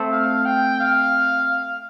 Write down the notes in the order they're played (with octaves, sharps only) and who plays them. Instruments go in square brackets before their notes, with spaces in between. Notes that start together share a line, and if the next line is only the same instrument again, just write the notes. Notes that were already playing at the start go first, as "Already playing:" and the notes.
Already playing: [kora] A3 C4
[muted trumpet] F5
G5
F5